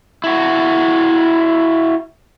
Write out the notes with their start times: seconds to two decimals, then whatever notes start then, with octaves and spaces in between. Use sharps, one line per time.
0.24 E4 F#4